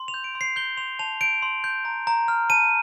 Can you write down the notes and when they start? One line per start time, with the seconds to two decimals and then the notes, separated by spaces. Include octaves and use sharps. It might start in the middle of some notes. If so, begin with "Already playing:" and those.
Already playing: C6
0.08 F7
0.14 G6
0.24 D7
0.35 C6
0.41 C7
0.56 G6 G7
0.77 C6 F7
0.99 A5 F7
1.21 G6 D7
1.42 C6
1.64 G6
1.85 A#5
2.07 A#5
2.28 F6
2.50 A5 D#7